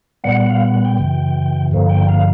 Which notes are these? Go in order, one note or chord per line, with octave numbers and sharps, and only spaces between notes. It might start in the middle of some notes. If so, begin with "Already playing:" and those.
A#2 G3 B3 F#5
F5
F#5
F#5
G5
F#2 C#3 E3
G2 D3 F3 A#3
G5
F5